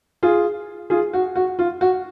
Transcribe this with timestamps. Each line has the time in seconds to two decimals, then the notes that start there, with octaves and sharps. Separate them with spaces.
0.23 F4 G#4
0.90 F4 G#4
1.13 F#4
1.36 F#4
1.59 F4
1.81 F#4